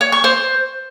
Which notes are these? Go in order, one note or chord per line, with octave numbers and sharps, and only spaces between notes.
C#5
C#6
C5